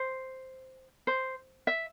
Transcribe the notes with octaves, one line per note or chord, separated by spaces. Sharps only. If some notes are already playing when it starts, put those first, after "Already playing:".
Already playing: C5
C5
E5